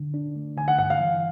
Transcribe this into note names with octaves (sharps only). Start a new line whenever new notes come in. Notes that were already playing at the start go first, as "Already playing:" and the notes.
Already playing: D3
D4
A3
D3 G#5
F#5
G2 F#5
F5
E3